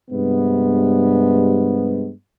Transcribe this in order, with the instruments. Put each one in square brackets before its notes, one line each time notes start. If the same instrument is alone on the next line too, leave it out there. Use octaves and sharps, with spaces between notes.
[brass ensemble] G2 C3 G#3 B3